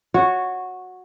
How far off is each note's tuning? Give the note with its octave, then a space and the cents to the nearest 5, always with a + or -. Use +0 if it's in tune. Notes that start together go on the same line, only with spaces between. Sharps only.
F#4 -10 C#5 +0